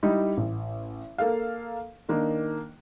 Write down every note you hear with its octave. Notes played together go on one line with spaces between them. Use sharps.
G3 D#4 E4
A1
A#3 A4 A#4 F5
D#3 A#3 D4 D#4